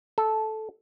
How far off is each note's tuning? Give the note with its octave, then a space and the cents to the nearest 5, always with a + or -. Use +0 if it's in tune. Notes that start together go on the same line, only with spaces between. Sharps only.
A4 -10